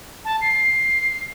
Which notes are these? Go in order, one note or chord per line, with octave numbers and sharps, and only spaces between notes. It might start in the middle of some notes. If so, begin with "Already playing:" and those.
A5
C7